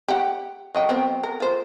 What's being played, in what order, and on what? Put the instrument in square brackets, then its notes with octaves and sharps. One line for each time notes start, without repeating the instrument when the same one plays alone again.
[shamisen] G4 F#5
F#3 D#5 G5
F#3 B3 C4
A#4
F4 C5